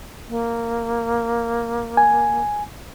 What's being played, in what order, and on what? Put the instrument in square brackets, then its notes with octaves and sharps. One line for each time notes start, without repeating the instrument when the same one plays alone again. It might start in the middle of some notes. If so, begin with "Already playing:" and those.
[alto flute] A#3
[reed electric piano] G#5